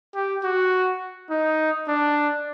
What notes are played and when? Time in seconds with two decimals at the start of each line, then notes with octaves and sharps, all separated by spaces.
0.15 G4
0.44 F#4
1.30 D#4
1.88 D4